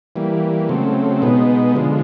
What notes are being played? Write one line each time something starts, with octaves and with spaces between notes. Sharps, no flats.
E3 G3 A#3
C#3 F#3 A3 C4
B2 G#3 B3 D#4
D3 F3 G#3